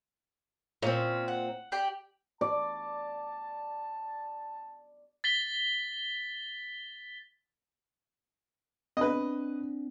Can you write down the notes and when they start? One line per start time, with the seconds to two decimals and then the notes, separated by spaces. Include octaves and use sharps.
0.82 A#2 C4 C#4
1.28 F#5
1.72 G4 D5 G5
2.41 D5 A5
5.24 A6 B6 G7
8.97 C4 D4 B4 D#5